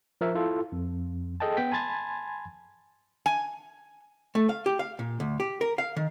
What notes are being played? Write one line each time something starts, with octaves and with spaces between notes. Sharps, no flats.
F3 A#4 E5
E4 F4 A4
F2
G#4 A4 D#5 G5 A5
B3 G5 B6
G#5 A5 B5 C6 G#6 A6
G#5
A3
F5
G4
F5
A#2
D2
G4
A#4
F5
D#3